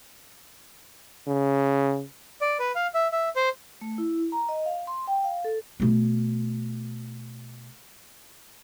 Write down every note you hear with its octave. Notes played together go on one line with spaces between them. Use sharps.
C#3
D5
B4
F5
E5
E5
C5
A3
E4
A#5
D#5
F5
C6
G5
F5
A4
B2 A3